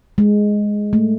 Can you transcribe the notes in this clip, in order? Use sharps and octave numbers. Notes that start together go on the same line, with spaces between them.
G#3
A3